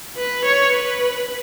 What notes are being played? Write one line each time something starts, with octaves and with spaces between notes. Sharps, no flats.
B4
C#5
B4